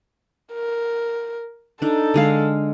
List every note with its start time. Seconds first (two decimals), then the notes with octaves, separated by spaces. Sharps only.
0.54 A#4
1.82 D4 D#4 A4
2.14 D3 G#3 F5